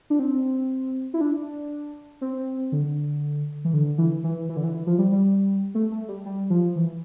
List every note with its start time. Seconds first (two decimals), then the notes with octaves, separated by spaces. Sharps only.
0.10 D4
0.19 C4
1.14 E4
1.21 D4
2.21 C4
2.72 D3
3.65 E3
3.73 D3
3.98 E3
4.24 E3
4.49 E3
4.57 D3
4.64 E3
4.74 E3
4.87 F3
4.98 G3
5.12 G3
5.75 A3
5.91 A3
6.08 G3
6.26 G3
6.50 F3
6.76 E3